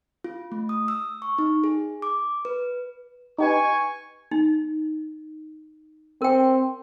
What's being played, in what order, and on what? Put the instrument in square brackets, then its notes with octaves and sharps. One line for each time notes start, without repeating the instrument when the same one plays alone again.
[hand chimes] F4
A3
D#6
E6
C#6
D#4
G#4
D6
B4
[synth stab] D#4 G4 B4 [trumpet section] G#5 C#6
[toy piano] D#4
[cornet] C4 [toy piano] A#4 G5